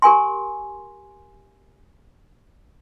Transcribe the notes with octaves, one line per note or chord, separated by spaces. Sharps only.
G4 A#4 G#5 C6